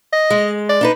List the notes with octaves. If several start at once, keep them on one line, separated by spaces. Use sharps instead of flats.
D#5
G#3
D5
D4 D#4 B4